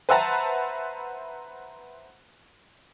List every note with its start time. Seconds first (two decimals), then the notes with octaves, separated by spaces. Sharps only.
0.09 B4 C5 E5 F#5 A5 A#5